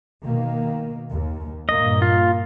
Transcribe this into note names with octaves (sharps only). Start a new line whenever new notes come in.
B2 D#3 A#3
D#2
G2 A#2 A#3 D#5
F4